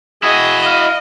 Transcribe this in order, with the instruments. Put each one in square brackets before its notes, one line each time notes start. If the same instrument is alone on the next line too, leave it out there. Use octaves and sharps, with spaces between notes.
[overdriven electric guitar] E4 F#4 [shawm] G#4 [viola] D#5
[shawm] F5